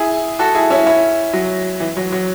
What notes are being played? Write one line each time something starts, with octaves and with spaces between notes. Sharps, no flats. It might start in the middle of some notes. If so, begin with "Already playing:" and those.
Already playing: E4 G#4
F#4 A4
E4 G#4
C#4 E4
C#4 E4
F#3
E3
F#3
F#3